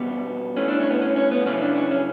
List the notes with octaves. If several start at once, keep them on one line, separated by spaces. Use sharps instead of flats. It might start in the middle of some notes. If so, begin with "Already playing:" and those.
Already playing: E2 B2 G3 B3
G2 E3 A3 C#4
D4
C#4
B3
C#4
C#4
B3
F#2 C#3 E3 G3 C#4
D4
C#4
C#4